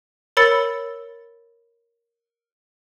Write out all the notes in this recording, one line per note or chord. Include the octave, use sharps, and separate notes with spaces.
A#4 C#5 B5 E6 A6 C#7